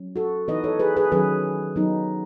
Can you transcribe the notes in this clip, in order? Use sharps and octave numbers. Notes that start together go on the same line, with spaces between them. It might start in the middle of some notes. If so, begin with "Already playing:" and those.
Already playing: F#3 C#4
F#4 A4
E3 B3 D#4 B4 D#5
A4 C#5
G#4 B4
G#4 B4
D#3 F#3 C#4 G#4 B4
F#3 B3 D#4